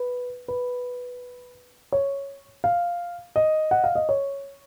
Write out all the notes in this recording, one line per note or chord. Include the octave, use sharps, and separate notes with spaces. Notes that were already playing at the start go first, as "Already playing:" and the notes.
Already playing: B4
B4
C#5
F5
D#5
F#5
F5
D#5
C#5